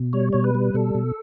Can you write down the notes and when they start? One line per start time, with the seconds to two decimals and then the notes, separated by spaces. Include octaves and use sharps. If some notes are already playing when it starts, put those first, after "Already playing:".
Already playing: B2
0.13 G3 C#5
0.33 B2 C#5
0.44 B4
0.55 G3
0.74 B2 A4
0.95 B2